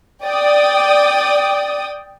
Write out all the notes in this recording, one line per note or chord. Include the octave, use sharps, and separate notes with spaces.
D5 G5 D#6